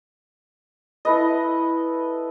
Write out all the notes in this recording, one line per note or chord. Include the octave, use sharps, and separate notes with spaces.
E4 A4 B4 D#5